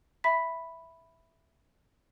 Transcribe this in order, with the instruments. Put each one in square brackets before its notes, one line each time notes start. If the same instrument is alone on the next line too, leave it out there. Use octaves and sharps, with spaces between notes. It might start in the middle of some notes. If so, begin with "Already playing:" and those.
[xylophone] E5 B5 B6